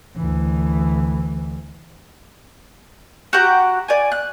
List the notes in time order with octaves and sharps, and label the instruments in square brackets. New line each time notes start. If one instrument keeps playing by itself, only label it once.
[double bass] D2 E3
[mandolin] F#4 G4 F#5 A#5
D5 G#5
F#6